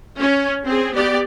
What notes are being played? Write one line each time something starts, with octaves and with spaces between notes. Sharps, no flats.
C#4
C4 G#4
B3 G4 D5